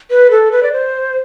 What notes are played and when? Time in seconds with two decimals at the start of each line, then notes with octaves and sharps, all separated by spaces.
0.11 B4
0.31 A4
0.52 B4
0.63 D5
0.73 C5